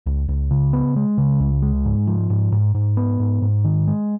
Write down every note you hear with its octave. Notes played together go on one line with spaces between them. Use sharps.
C#2
C#2
C#3
B3
G#3
C#3
C#2
G#3
G#2
F3
G#2
G#2
G#2
B3
G#2
G#2
D#3
G#3